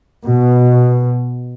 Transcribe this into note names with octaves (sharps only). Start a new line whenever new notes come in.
B2